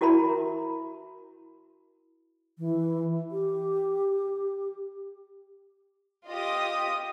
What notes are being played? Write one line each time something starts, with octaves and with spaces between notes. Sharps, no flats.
E4 F#4 A#4 E5 A#5 B5
E3
G4
F4 G4 D#5 D#6